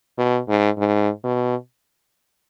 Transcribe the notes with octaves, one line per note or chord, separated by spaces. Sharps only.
B2
G#2
G#2
B2